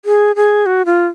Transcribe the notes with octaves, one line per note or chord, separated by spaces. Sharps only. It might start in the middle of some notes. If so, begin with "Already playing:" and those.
G#4
G#4
F#4
F4